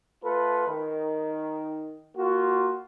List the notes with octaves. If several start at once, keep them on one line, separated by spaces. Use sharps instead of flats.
A3 F4 A4 B4
D#3
A#3 F4 F#4